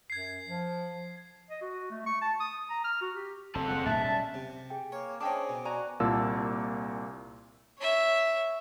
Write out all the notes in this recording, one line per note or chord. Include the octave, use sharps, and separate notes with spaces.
F#2 G#6 C7
F3
D#5
F#4
A3
C#6
A5
D#6
A#5
F6
F#4
G4
F#1 C4 A4 A5
G#3 F#5
D1 B1 F#2 E5 A5
G3 A5
C3
G#4 G5
A#3 C#5
C#4 D4 G#4 C5 D#5 G5 A5 D6
B2
F#4 D5 G#5 A#5
C2 A#2 A#3 A5 E6
C#5 E5